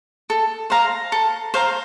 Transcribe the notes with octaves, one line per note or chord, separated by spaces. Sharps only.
A4
C5 F5 A#5
A4
C5 F5 A#5